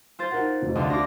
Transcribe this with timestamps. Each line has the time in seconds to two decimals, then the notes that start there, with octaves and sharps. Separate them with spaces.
0.19 F4 C5 A6
0.31 D#4 A#4 F#5
0.62 F1 F2
0.75 D2 D4 F4 D#5 F#5
0.90 D4 F4 D6 A#6